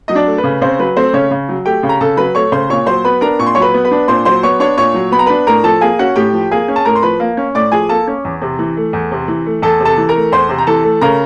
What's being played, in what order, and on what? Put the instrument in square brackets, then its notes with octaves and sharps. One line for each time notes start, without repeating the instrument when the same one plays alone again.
[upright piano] F#3 D#5
D4 D5
A3
B4
C#3
C#3 C4 C5
F#3 B4
A3 C4 C5
C#3 C#4 C#5
C#3
F#3
A3 G4 G5
C#3
A#5
C#3 A4 A5
F#3 B4 B5
A3 C#5 C#6
C#3 C5 C6
A#2 C#5 C#6
F#3 C5 C6
B3 B4 B5
D4 A#4 A#5
A#2 C#6
C6
F#3 C#5 C#6
B4 B5
B3
B4 B5
D4
A#2 C5 C6
F#3 C5 C6
B3 C#5 C#6
D4 C#5 C#6
A#2 C#5 C#6
F#3
B3 B5
A#5
D4 B4 B5
A2 A#4 A#5
F3 A4 A5
A#3 G#4 G#5
C#4 F#4 F#5
A2 G4 G5
F3
A#3 G#4 G#5
C#4
A5
A2 A#4 A#5
C6
F3 B4 B5
A#3
C#4
A2 D5 D6
F3 G#4 G#5
A#3 A4 A5
C#4
E2
C3
E3
A3
E2
C3
E3
A3
E2 A4 A5
C3
A4 A5
E3
A#4 A#5
A3
E2 C5 C6
C3
A#5
E3 A4 A5
A3
C#3 A#4 A#5